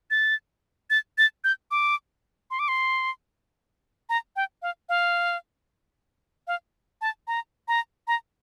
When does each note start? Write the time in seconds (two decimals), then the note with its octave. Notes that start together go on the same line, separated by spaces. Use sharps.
0.11 A6
0.90 A6
1.18 A6
1.44 G6
1.71 D6
2.51 C6
2.59 D6
2.68 C6
4.09 A#5
4.36 G5
4.62 F5
4.89 F5
6.47 F5
7.01 A5
7.27 A#5
7.68 A#5
8.07 A#5